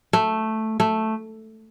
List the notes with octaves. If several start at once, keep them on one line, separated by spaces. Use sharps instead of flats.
A3
A3